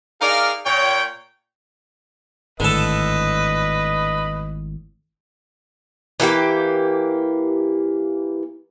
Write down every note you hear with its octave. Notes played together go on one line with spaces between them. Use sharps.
D#4 G#4 A#4 D5 F5
A#2 C#5 G5
G#1 A2 D3 A4 B4 D#5
E3 A#3 G4 G5